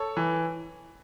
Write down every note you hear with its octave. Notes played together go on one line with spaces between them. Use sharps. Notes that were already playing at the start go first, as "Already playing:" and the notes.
Already playing: A4 C#5
E3